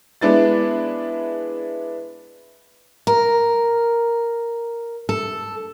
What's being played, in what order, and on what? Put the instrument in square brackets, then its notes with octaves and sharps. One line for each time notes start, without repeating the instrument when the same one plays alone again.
[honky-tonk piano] G#3 B3 D4 E4 B4 A6
[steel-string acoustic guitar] A#4
A4